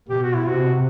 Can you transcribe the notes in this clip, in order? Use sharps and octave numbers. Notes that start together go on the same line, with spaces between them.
B2 G4
F#4
E4
C3 F#4